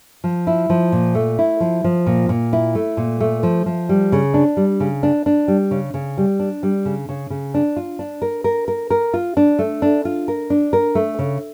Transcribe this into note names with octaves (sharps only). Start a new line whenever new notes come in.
F3
E4
F3
A#2
A3
E4
F3
F3
A#2
A#2
E4
A3
A#2
A3
F3
F3
G3
C#3
D4
G3
C#3
D4
D4
G3
C#3
C#3
G3
D4
G3
C#3
C#3
C#3
D4
F4
D4
A#4
A#4
A#4
A#4
F4
D4
A3
D4
F4
A#4
D4
A#4
A3
C#3